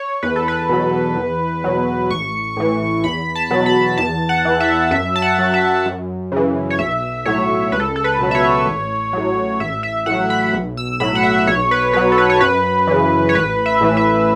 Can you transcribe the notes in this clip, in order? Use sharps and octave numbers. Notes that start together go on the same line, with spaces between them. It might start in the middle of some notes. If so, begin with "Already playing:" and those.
Already playing: C#5
E2 B4
A4
B4
B2 F#3
E2
B2 F#3
A1 C#6
A2 E3
E2 B5
A5
B2 F#3
B5
E2 A5
F#5
E3
E5
F#2 E5
A5
F#5
F#3
E5
F#2
C#3 E3
C#5
B1 E5
A2 F#3 C#5
C#2 B4
A4
A4
B4
B2 F#3
E5
C#5
A1
A2 F#3
A1 E5
E5
A2 F#3 F#5
B5
B1
E6
A2 F#3 B5
F#5
E5
B1 C#5
B4
B2 F#3 B4
A4
B4
C#5
F#2 B4
C#3 E3
C#5
A1 B4
E5
A2 E3
E5